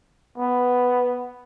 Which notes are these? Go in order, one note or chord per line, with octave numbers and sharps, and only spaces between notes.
B3